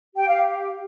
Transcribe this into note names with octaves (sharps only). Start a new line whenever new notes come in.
G4 G5
F5